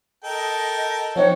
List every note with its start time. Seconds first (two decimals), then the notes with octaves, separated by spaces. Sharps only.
0.24 A4 A#4 D#5 G5
1.16 F3 C4 D#4 C#5 F#5